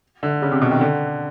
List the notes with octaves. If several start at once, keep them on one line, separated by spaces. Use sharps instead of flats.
D3
C#3
C3
B2
D#3
D3